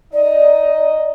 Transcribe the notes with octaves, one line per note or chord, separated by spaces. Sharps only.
D#4 D5 D#5